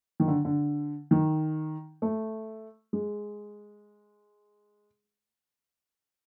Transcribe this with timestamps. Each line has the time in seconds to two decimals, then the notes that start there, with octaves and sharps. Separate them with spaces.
0.20 D#3
0.28 D3
0.45 D3
1.11 D#3
2.02 A3
2.93 G#3